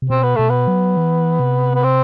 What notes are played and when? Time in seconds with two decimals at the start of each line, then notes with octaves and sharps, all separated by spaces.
0.02 C3
0.10 B2 C4
0.23 B3
0.36 B2 A3
0.49 B3
0.68 F#3
0.97 E3
1.40 C3
1.74 B3
1.83 C4